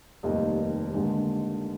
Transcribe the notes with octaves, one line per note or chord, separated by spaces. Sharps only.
F1 D#2 D#3 G3 D#5
D#2 D3 G#3 D4